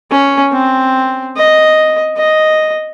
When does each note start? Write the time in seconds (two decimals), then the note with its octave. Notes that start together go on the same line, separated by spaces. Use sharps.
0.11 C#4
0.52 C4
1.37 D#5
2.17 D#5